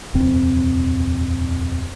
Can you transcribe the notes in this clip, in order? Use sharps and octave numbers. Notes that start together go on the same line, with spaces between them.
D#1 F2 C3 C4